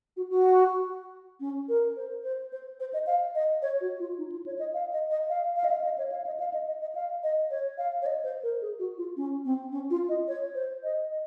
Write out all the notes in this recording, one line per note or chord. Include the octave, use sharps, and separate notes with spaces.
F#4
F#4
C#4
A#4
C5
C5
C5
C5
D#5
F5
D#5
C#5
F#4
F4
D#4
F4
C#5
D#5
F5
D#5
D#5
F5
F5
D#5
F5
D#5
C#5
F5
D#5
F5
D#5
D#5
D#5
F5
D#5
C#5
F5
C#5
D#5
C5
A#4
G#4
F#4
F4
C#4
C4
C#4
F4
D#5
C#5
C5
D#5
D#5